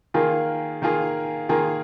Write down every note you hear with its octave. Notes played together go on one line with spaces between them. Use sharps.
D#3 A#3 F4 G#4
D#3 A#3 F4 G#4
D#3 A#3 F4 G#4